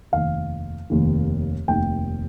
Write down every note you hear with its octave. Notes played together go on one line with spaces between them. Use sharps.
F1 D#2 D#3 F5
F1 D#2 D#3
F1 D#2 D#3 G5